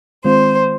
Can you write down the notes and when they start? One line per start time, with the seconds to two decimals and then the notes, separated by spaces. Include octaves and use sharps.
0.25 D#3 G#3 C4 F4 C5